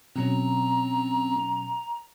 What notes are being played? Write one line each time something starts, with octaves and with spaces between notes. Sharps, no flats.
B2 F#3 C4 C#4 A#5